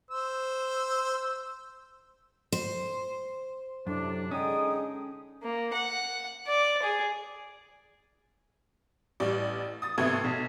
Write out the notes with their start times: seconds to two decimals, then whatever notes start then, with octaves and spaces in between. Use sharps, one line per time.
0.11 C5 E6
2.52 C5
3.87 F#2 A2 C3 D4
4.31 D3 G#3 C#4 D#4 G5 D#6
5.43 A#3
5.73 F#5
6.47 D5
6.83 G#4
9.20 A1 G3 D5
9.82 D#6 A6
9.98 G#1 C3 A3 B3 G#6
10.24 B1